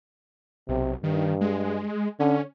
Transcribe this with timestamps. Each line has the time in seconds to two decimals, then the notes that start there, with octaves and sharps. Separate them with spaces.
0.69 B1 C3
1.03 G2 D#3
1.41 G#3
2.20 D3 C#4